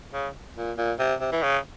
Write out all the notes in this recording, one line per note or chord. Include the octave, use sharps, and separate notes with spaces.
C#3
A#2
A#2
C3
C3
E3
C#3